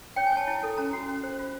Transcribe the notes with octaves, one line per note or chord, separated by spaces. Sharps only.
C#5 G5
G#5
C#5 A5
E4
A4
C#4 A#5
F#4
C#4
C5
F4